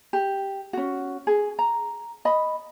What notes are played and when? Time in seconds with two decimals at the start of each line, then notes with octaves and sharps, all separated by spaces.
0.13 G4
0.73 C#4 F#4
1.27 G#4
1.59 A#5
2.25 D#5 B5